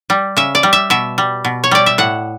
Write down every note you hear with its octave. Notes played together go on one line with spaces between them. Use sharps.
G3
C#3 E5
D5
G3
E5
B2 E5
G3
B2
C#5
G3 D5
E5
A2 F#5